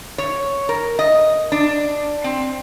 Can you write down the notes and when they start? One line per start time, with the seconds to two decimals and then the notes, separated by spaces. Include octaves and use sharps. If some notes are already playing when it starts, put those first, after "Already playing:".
0.18 C#5
0.69 A#4
0.99 D#5
1.52 D4
2.24 C4